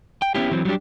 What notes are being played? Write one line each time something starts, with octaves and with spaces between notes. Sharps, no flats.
G5
B3 C#4 E4 G4
E3 F#3 C4
F#3 G3 A3 D4 G4